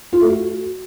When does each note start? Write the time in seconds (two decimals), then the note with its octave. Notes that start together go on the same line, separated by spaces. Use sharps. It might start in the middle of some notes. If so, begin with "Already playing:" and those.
0.13 F4
0.21 A3
0.30 F#4